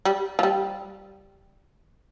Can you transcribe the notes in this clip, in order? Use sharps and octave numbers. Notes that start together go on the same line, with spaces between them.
G3
F3
G3